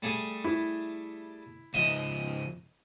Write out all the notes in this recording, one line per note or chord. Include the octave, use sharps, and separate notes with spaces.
G3 A3 G#4
E4
C#2 F3 D#5 E5 D#6